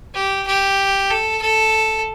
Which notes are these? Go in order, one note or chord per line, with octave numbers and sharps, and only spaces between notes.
G4
G4
A4
A4